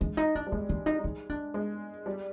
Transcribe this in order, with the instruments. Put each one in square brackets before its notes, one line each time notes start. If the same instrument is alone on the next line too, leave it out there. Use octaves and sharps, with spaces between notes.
[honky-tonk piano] G#3 [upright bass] D4
[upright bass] D#4
D4
[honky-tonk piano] G3
[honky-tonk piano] G#3 [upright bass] D4
[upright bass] D4
D#4
D#4
D4
[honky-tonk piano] G#3
G3